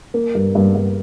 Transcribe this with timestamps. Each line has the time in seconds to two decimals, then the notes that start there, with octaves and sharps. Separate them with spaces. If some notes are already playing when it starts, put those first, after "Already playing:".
0.14 A#3
0.35 G2
0.55 G2
0.75 G2